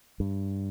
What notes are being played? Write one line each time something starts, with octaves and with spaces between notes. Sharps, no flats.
G2